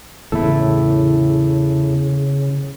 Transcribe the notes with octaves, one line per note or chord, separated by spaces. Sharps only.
E2 A2 C#3 E4 A4